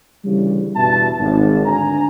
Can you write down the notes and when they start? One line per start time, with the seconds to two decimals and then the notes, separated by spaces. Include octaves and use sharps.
0.25 D2 C#3 E3 G3
0.76 E2 G2 B2 E5 A5
1.18 G#1
1.65 D2 D3 D4 G#5 A#5